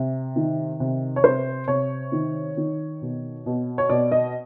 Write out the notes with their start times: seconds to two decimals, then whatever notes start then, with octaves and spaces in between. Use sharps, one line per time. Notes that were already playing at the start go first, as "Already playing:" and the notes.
Already playing: C3
0.36 D#3
0.80 C3
1.16 C#5
1.23 C3 C5
1.68 C3 C#5
2.12 D#3
2.57 D#3
3.02 B2
3.46 B2
3.78 C#5
3.90 B2 D5
4.12 D#5